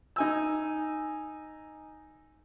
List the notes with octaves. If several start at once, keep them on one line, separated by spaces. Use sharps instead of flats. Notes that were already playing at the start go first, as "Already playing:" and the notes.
D#4 G#5 E6